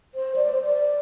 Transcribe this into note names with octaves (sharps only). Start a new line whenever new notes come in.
C5
D5
C5
D5